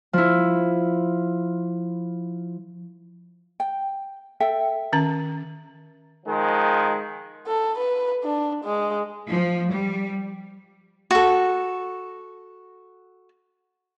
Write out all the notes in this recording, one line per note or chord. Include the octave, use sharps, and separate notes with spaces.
F3 E4
G5
A4 E5 G5
D#3 C#4 A#5
D#3 F3 G#3
A4
B4
D4
G#3
F3
G3
F#4 A4